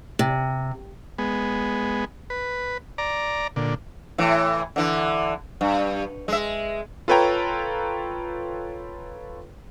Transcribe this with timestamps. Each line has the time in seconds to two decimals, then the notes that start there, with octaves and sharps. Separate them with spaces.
0.19 C3
1.18 G#3 B3
2.30 B4
2.98 D5 A#5
3.56 A#2 D3
4.18 A2 E3
4.76 D3 E3
5.61 G2
6.28 G#3 E5
7.08 F4 A4 B4 C#5 G5 A#5